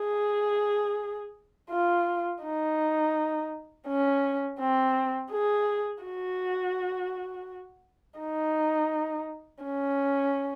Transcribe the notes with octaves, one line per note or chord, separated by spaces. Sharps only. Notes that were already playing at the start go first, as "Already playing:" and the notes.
Already playing: G#4
F4
D#4
C#4
C4
G#4
F#4
D#4
C#4